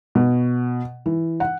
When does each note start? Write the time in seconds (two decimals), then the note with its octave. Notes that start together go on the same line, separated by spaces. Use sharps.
0.15 B2
1.06 E3
1.40 F#5